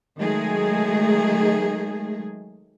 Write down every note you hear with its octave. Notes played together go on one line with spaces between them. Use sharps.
D#3 F#3 G#3 A3 G#4